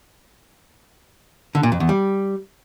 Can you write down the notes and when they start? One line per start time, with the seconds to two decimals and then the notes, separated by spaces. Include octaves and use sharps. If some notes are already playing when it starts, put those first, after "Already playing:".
1.55 D3
1.63 A#2
1.72 F2
1.80 E2
1.89 G3